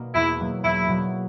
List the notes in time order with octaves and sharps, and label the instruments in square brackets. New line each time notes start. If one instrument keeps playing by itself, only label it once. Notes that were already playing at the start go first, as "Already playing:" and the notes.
Already playing: [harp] B2 A#3
[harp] E2 [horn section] E4
[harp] B2 F#3 A#3
[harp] E2 [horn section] E4
[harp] B2 F#3 A#3